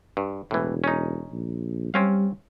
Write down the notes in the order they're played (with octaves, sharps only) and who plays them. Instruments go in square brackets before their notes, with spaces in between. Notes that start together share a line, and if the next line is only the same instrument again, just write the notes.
[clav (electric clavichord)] G2
[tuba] E1 [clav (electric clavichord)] A2 E3
[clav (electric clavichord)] C#4 D#4
[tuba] A#1
[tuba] G3 [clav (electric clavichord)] C4 C#4 F5